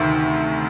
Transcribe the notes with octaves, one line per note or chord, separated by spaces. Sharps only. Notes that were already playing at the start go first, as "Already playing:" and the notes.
Already playing: D2 C3 D#3